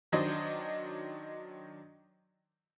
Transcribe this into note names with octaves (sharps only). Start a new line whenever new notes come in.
D#3 F#3 D4 C5 D#5